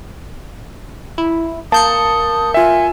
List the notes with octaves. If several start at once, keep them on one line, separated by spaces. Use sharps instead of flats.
E4
A#3 A5 D#6 G6 C#7
F4 E5 G#5